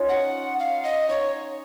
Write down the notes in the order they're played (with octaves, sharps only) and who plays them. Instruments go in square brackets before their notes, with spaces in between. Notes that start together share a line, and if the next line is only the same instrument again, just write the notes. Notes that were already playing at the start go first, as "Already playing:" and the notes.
Already playing: [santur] C#4 D#4 F4
[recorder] F#5
F5
D#5
[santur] D#4 [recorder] C#5